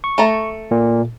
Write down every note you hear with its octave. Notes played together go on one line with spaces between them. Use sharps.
C#6
A3 A4 A#5
A#2